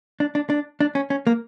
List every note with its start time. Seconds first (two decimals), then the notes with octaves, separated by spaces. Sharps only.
0.20 D4
0.35 D4
0.50 D4
0.80 D4
0.95 C#4
1.10 C#4
1.27 A#3